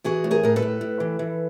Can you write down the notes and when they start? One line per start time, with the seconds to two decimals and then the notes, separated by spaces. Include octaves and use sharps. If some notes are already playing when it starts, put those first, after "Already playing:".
0.04 E3 F#4 G#4
0.24 A2
0.31 G#4 A#4
0.43 A2 A#4
0.56 A4 B4
0.62 A2
0.81 A2
1.00 E3
1.19 E3